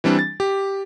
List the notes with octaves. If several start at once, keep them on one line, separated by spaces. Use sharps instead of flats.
E3 G3 C4 D4
A6
G4